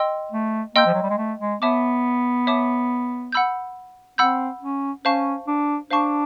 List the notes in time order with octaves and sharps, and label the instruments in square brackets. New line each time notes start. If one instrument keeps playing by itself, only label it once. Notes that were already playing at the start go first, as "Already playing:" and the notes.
Already playing: [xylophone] D#5 G5 C6 E6
[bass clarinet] A3
[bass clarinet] A#3 [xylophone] D#5 G5 C6 E6 G6
[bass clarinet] F3
F#3
G3
G#3
A3
G#3
[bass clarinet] B3 [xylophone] C#5 E5 A5 D6
[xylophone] C#5 E5 A5 D6
F#5 B5 E6 G6
[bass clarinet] C4 [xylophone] F#5 B5 E6 G6
[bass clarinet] C#4
[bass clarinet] C#4 [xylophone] C5 F5 A5 C#6
[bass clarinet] D4
[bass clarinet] D4 [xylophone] C5 F5 A5 C#6